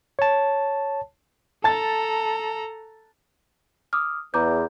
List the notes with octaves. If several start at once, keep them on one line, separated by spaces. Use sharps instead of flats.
C#5 A5
A4 A5 A#5 A6
D6 D#6 F6
E2 A#5 D6 G6